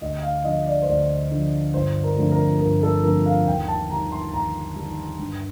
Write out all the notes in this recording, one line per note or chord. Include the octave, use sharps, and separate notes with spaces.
D2 D#5
F5
D3 F3 D#5
D5
C5
D2 D5
D3 F3
G1 C5
A#4
F2 D3 A3
A#4
G1 A#4
A4
F2 D3 A3 A#4
F5
D#2 G5
A5
D#3 G3 A#5
C6
D#2 A#5
G3
D#3
G2